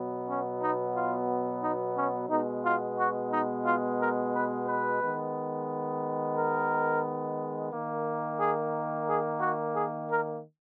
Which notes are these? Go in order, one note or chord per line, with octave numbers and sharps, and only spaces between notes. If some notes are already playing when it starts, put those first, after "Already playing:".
Already playing: B2 F#3 B3
C#4
D#4
F4
D#4
C#4
B2 G#3 B3 D#4
F4
F#4
D#4
F4
A#4
B4
B4
D#3 G#3 B3
A#4
D#3 A#3
G#4
G#4
F#4
G#4
A#4